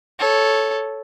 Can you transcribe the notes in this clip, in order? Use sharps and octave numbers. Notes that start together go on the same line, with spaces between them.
A4 C#5